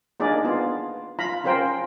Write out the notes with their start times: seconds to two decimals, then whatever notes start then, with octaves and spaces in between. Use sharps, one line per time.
0.20 A#3 D4 D#4 G#4 A#4 D5
0.45 B3 F4
1.19 F4 F5 A#5 B5
1.44 C#4 F4 A#4 C5 G5